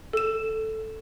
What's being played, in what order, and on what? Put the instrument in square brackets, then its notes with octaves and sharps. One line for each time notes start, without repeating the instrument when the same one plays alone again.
[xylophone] A4 E7